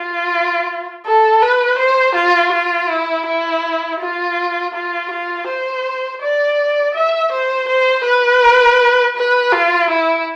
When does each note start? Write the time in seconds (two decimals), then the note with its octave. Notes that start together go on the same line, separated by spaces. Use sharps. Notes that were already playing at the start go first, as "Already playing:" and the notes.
Already playing: F4
1.06 A4
1.42 B4
1.78 C5
2.15 F4
2.52 F4
2.89 E4
3.26 E4
4.00 F4
4.74 F4
5.11 F4
5.48 C5
6.22 D5
6.95 E5
7.32 C5
7.68 C5
8.05 B4
9.17 B4
9.52 F4
9.90 E4